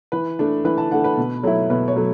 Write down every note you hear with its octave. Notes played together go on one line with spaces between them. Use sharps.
E3 B4
A3 D4
E3 B4
A5
A3 D4 F#5
B4
B2
F#3 A3 E4
B2 B4
C#5
F#3 A3